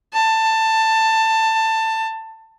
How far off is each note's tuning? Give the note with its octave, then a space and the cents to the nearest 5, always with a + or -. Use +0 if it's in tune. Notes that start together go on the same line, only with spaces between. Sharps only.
A5 +15